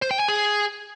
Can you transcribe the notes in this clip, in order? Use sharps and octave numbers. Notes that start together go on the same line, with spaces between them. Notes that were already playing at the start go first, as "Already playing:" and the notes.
C5
G5
G#5
G#4